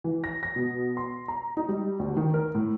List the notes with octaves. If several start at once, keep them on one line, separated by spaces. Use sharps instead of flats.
E3
A#6
A#6
B2
C6
A#5
D#4
G3
D2
D#3
A#4
A2